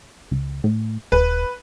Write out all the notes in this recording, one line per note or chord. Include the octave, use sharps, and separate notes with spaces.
C#2
A2
D#1 B4